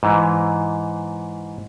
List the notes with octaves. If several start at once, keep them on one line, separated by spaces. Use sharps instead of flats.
G#2 E3